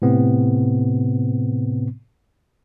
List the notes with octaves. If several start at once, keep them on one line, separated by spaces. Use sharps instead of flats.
A2 C3 B3 C4